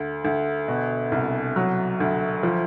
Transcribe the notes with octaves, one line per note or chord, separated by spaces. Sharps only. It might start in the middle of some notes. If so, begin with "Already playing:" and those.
Already playing: D2
D2
B2
C2
F#3
D2
F3